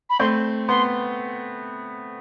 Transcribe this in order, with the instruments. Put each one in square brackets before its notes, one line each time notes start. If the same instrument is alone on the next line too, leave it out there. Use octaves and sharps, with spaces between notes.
[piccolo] B5
[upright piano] A3 C4 [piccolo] C6
[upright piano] B3 [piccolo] C6